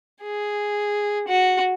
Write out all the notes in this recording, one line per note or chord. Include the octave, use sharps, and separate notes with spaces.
G#4
F#4